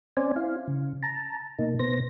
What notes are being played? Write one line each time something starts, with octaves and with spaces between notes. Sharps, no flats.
C4 C#4 C5 D5 G#5
E4 F5
C#3
A5 A#5
B2 A#3 D#4
B2 B3 C5 A#6